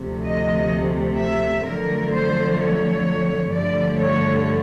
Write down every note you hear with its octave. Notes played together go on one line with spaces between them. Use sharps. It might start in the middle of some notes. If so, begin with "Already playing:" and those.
Already playing: D2 C3 F3 A3
D#5
E5
F2 D3 F#3 A3 A#4
C5
C#5
G2 D3 F3 A3 D5
C#5